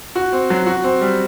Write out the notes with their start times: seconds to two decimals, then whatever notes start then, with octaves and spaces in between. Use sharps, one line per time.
0.16 F#4
0.32 C4
0.50 F#3
0.67 F#4
0.84 C4
1.01 G3